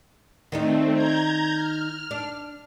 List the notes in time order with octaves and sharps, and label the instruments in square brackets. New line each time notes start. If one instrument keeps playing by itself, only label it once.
[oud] D#3 D4 D#4 [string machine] A3 C4
[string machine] A#5 G6 G#6
F6
[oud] D4